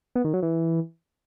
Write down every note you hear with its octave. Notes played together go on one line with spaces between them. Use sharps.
B3
D#3
F#3
E3